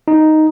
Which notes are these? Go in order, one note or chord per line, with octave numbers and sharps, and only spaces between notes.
D#4